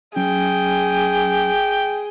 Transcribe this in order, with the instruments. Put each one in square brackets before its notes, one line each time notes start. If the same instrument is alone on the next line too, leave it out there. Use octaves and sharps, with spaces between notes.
[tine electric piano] F#3 C#4 [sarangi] G#4 [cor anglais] G5